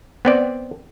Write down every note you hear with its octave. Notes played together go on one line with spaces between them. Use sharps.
B3 C4 D5